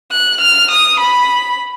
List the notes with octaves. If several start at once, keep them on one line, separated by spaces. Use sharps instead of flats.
F#6
F6
D#6
B5